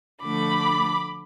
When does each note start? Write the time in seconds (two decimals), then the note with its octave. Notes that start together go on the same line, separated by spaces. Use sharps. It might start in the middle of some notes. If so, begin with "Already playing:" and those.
0.21 D3 F3 A3 B5 D6